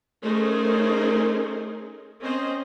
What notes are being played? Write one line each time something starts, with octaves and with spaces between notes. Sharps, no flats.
A3 C#4 D#4 G#4 A#4 C5
C4 C#4 C5 D#5